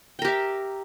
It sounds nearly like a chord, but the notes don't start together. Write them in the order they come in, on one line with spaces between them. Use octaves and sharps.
G5 A#4 G4 E5